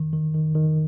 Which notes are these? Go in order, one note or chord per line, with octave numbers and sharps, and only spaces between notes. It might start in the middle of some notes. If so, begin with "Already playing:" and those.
Already playing: D#3
D#3
D#3
D#3